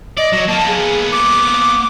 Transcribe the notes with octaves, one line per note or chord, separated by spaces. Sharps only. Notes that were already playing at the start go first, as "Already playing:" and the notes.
D5 D#5
F#3
A#3 B3 A5
G#4
D6